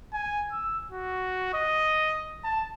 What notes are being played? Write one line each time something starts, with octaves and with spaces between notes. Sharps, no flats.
G#5
E6
F#4
D#5
A5